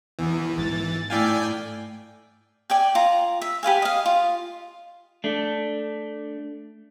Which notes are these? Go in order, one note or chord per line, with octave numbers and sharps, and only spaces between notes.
E2 E3
G#2 A6
A2 E4 D5 F5 G5 G#5
D5 G5 G#5
F4 A#5
E5
G4 B4 F5 G#5
D#5 F5
F4
A3 D4